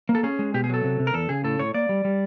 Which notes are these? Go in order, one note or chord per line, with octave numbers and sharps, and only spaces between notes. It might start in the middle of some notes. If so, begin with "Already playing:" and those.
A#3
A4
C#4 G#4
G#3
B2 G4
G#4
F#3 A4
C3
C3
A#4
E2 A4
C#3 G#4
A2 A4
A2 C#5
A#3 D5
G3
G3